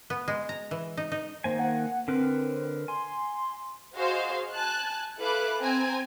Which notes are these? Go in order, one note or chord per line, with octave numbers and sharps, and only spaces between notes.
B3
G#3
A#5
E3
D#4
D#4
D#3 A#3 C5 G#5
F#5
D3 C4 A#4 B4
G#5 C6
F#4 G#4 C5 D#5 F5 C6
G#5 A5 F#6
E4 A4 B4 F5 D6 F#6
C4 G5 G#5 A#5